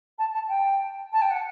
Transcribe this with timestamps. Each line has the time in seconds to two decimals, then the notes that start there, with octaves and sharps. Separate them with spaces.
0.18 A5
0.34 A5
0.48 G5
1.13 A5
1.21 G5
1.30 F#5